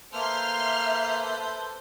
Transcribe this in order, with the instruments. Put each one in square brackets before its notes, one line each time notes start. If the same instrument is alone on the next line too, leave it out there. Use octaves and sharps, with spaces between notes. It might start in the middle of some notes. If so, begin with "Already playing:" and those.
[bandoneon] A#3 [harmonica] A4 B4 C5 [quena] E5 [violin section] C6 F6